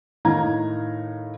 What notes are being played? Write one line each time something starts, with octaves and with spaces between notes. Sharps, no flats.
A2 D#3 F5 A#5 G#6